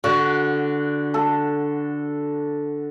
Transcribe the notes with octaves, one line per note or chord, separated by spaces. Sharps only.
D3 F#4
A4